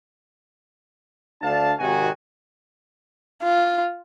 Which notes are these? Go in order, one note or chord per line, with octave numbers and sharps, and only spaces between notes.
D2 D4 F5 A5
G#1 C3 D#3 F#4 G#5
F4